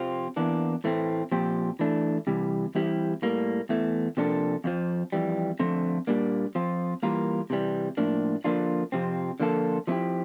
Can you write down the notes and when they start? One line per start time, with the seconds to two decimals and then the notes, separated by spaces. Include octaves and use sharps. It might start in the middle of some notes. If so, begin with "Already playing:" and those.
Already playing: F2 C3 F3 C4 F4
0.36 E2 E3 A#3 D4
0.84 A2 E3 A3 C4
1.32 A#2 F3 C4 G4
1.79 E3 A3 D4
2.27 C3 E3 G3
2.75 E3 G3 C4 E4 G4
3.22 A2 G3 A#3
3.69 E2 E3 A3
4.17 C3 F3 A#3 D4 A4
4.64 F2 D3 F3
5.12 F2 E3 G3
5.59 D3 F3 A3 C4
6.07 A#2 G3 A#3 D4
6.55 F3 C4 F4
7.03 E3 G3 A#3 F4 A#4
7.50 C3 E3 G3
7.97 A2 F3 A#3 D4
8.44 D3 F3 A#3 D4 F4
8.92 F2 C3 F3 C4
9.40 D3 F3 A#3 F4 A4
9.87 F3 A3 C4 E4 G4